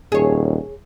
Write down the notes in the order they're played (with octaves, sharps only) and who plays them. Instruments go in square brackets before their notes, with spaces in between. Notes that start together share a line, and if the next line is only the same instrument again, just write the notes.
[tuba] D#1 [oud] G#4 C#5